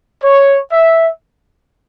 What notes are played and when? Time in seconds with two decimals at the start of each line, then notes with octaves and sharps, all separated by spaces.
0.23 C#5
0.72 E5